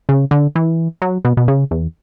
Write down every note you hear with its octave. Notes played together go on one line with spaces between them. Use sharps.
C#3
D3
E3
F#3
B2
B2
C#3
E2